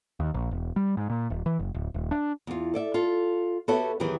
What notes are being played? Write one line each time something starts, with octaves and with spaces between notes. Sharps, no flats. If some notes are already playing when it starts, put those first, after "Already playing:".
D#2
A#1
E1
G3
G#2
A#2
D#1
E3
F#1
D1
D#1
D4
E2 F4
A4 D5 E5
F4 A4
B3 F#4 G4 A4 C#5 E5
E2 D#3 E3 F#3 G4 G#4